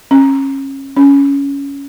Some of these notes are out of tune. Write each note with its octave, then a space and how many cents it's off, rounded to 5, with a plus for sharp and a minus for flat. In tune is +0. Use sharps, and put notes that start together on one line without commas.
C#4 -30
C#4 +10